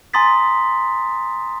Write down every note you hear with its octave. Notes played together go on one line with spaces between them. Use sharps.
G#5 A#5 C6 D#6 A6 B6